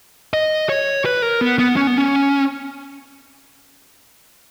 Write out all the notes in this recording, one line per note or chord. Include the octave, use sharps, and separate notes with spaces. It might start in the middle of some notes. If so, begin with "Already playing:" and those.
D#5
C#5
B4
A#4
B3
B3
C#4
B3
C#4